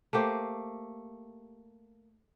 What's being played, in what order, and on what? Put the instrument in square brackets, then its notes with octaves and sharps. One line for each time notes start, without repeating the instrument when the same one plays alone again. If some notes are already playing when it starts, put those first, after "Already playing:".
[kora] A3 A#3 G4 C5